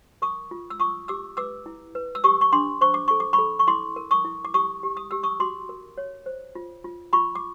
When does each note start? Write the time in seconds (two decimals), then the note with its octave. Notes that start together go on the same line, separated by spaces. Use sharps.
0.22 A#4 C#6 D#6
0.51 F4
0.70 E6
0.80 F4 C#6 D#6
1.08 G4 D6 E6
1.37 B4 D6 E6
1.66 E4
1.95 B4
2.15 E6
2.24 G4 C#6 D#6
2.41 C#6
2.53 D4 C6 D6
2.81 C5 C#6
2.94 D6
3.08 A4 C#6
3.20 D6
3.33 B5 C#6
3.39 A4
3.59 C#6
3.68 E4 C6 D6
3.96 A#4
4.11 C#6 D#6
4.25 E4
4.45 D6
4.54 G4 C#6 D#6
4.83 G4
4.97 D#6
5.11 G4 E6
5.23 C#6 D#6
5.40 F#4 C6 D6
5.69 A#4
5.98 C#5
6.26 C5
6.55 F4
6.84 F4
7.13 F4 B5 C#6
7.35 D6